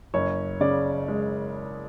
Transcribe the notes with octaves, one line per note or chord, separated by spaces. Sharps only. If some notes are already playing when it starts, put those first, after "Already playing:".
F#1 C#5
C#3 D5
G#3